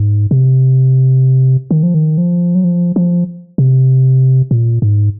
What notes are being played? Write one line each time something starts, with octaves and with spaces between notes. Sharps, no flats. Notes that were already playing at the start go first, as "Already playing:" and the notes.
Already playing: G#2
C3
D#3
F3
D#3
F3
F#3
F3
F3
C3
A#2
G#2